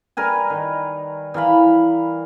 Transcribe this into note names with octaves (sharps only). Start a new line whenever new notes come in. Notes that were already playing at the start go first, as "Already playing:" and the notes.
G3 A#4 B4 G#5
D#3
E3 A#4 F5 B5